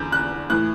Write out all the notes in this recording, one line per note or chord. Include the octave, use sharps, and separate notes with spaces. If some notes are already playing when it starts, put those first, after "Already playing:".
Already playing: E2 D3 G6
F#6
A2 E3 F#6